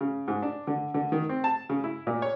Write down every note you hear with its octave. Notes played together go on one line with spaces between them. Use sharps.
C#3
G#2
D4
D3
D3
D#3
C4
A5
C#3
E4
A#2
C#5